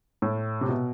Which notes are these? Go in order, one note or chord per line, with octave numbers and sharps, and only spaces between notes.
A2
C3
B2